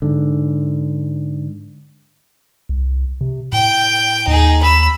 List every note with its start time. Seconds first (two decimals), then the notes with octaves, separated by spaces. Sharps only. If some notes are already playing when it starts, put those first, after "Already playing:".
0.02 G#2 D3
2.69 C2
3.21 C3
3.53 A2 G5
4.28 D#2 D#4 G#4
4.62 B5 E6